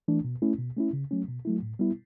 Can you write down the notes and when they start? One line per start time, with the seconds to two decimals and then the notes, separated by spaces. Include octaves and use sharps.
0.08 E3 A3 D4
0.25 B2
0.42 A3 C#4 E4
0.59 B2
0.77 A3 C#4 E4
0.93 C#3
1.11 F#3 A3 C#4
1.28 B2
1.45 F#3 A3 E4
1.62 A2
1.79 G3 B3 E4